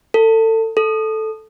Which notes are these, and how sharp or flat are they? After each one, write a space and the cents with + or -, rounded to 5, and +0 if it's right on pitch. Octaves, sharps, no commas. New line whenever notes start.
A4 +30
A4 -5